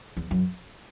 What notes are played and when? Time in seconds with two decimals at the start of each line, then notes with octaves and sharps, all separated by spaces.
0.17 E2
0.31 F#2